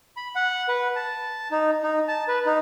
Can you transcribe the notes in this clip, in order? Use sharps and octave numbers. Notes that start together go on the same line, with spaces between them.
B5
F#5
B4
A5
D#4
D#4
A5
B4
D#4